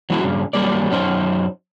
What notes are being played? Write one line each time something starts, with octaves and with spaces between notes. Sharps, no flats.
F#3 G3 C#4 E4 F#4
G2 C#3
G2 F#3 G3 A#3 D5
F#2 C#4 D#4 C5